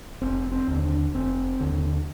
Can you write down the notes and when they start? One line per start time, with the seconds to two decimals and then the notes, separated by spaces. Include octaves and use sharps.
0.21 F1 C4
0.52 C4
0.67 D#2 D3
0.83 D4
1.14 F1 C4
1.60 D#2 D3